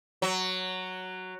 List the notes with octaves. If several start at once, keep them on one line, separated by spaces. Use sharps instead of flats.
F#3